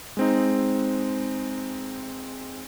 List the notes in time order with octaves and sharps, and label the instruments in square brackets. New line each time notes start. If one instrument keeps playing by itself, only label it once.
[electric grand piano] G#3 C4 D#4